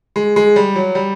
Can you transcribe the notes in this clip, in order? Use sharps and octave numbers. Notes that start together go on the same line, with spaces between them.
G#3
G#3
G3
F#3
G3